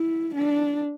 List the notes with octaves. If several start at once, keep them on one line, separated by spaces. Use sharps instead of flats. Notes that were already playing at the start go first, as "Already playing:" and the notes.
Already playing: E4
D4